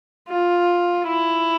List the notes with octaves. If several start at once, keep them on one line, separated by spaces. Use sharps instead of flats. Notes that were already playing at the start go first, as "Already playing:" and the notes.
F4
E4